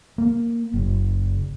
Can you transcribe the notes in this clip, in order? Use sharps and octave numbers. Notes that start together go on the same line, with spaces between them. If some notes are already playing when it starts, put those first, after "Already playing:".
A#3
F#1